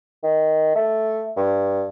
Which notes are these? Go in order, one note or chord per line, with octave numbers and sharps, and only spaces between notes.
D#3
A3
G2